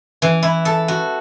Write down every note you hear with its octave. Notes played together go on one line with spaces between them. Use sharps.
E3
E4
A4
F#4